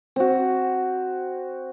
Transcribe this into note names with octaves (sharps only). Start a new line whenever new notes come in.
C4 F#4